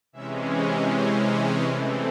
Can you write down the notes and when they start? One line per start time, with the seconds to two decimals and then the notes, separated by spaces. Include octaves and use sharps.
0.13 C3 E3 G#3 C#4 E5
0.51 C#5
0.89 C5
1.27 C5
1.66 E3 A3 C4 A4